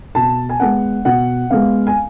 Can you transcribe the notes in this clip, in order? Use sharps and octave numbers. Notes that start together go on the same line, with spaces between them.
B2 A5
G#5
G#3 B3 F#5
B2 F#5
G#3 B3 F5
G#5